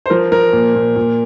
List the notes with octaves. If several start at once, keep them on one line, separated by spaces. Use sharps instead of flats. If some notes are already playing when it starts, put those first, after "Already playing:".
C5
F3 A#4
F3 A#4
A#2
A#2
A#2